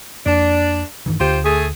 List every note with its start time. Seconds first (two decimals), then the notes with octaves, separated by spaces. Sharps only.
0.26 F2 A#3 D4
1.06 G2 D#3 E3
1.20 D2 D3 F4 G4 C5
1.45 A3 G#4